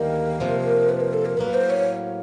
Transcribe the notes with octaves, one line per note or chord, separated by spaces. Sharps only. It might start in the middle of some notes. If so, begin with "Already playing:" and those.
Already playing: D2 D#3 G3 A#3 A#4
F2 C3 F3 A#3
B4
A#4
A4
A#4
A2 F#3 A#3 B4
C5
C#5